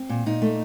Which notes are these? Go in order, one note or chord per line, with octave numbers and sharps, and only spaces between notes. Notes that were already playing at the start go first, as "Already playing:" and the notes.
Already playing: C4
A#2
A#2 D#4
A3